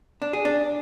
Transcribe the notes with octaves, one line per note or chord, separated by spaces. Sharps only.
D4
G#4
D4